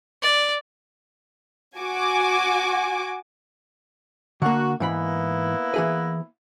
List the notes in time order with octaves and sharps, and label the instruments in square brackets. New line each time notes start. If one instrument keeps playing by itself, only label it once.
[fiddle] D5
[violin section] F#4 G#5 D6
[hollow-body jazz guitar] D3 A#3 [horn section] F#4
[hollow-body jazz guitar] G#2 E3 B5 [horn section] A#3 B3 E4
[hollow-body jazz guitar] E3 G#4 B4